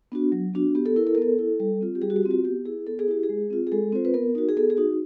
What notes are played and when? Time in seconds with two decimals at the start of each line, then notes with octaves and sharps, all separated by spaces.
0.12 B3 D4 F#4
0.32 F#3
0.53 B3 D4 F#4
0.75 B3 G4
0.86 A4
0.96 E4 A#4
1.07 A4
1.15 A#4
1.17 B3 A4
1.39 E4
1.60 G3
1.81 C4 F4
1.95 G4
2.02 G3 G#4
2.10 F#4
2.16 G4
2.23 C4 F4
2.31 F#4
2.44 B3 G4
2.66 E4 G#4
2.87 B3 A4
2.99 G#4
3.08 E4 G4
3.23 G#4
3.29 G#3
3.50 C4 F4
3.67 G#4
3.72 G#3 A4
3.92 C4 F4 C5
4.05 B4
4.14 B3 A#4
4.35 D#4 F#4
4.49 G#4
4.57 B3 A4
4.70 G#4
4.77 D#4 F#4